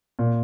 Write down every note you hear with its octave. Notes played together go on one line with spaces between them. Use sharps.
A#2